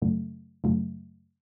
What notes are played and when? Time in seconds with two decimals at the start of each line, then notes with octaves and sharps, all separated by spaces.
0.02 F#2 C#3 F#3 A3
0.64 F#2 C#3 F#3 A3